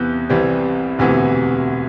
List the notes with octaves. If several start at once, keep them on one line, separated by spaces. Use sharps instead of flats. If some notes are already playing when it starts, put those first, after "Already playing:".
Already playing: E2 C3 E3 B3 F#6 G6
C2 C3 E3 G3 C4
E1 D2 C3 E3 B3